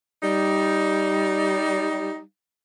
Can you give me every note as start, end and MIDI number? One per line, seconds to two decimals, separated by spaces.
0.23 2.18 55
0.23 2.18 63